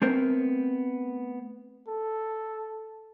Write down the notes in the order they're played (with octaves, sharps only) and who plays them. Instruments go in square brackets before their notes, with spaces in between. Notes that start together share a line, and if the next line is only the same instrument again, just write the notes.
[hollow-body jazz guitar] A3 B3 C4 A#4 C5
[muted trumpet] A4